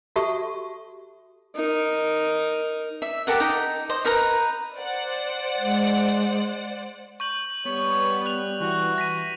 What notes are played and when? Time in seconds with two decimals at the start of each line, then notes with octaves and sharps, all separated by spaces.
0.16 F#4 G4 A4 E5 A5 C#6
1.56 D#4 A#4
3.02 E5
3.27 G4 A4 A#4 F#5
3.40 D#4
3.89 C5 D#5
4.05 D#4 A#4 B4 A#5
4.76 C5 D5 F#5
5.59 G#3
7.20 C#6 G6 F#7
7.65 G3 B3 C#5
8.26 F#6 F7
8.61 E3 F#4
8.98 A#6 B6 D#7